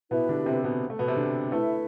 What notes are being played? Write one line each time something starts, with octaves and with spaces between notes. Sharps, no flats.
B2 B3 E4 G4 B4 E5
D3 D4
C3 C4
B2 B3
A3
B2 B3
C3 C4
D3 D4
A3 E4 A4 B4 E5